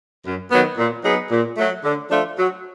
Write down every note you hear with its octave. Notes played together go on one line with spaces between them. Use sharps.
F#2
D#3 F#3 B3
A#2
F#3 B3 D#4 G#4
A#2
F#3 A3
D3
F3 A3 D4 F4
F#3